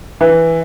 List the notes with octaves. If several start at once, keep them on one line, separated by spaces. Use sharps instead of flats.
E3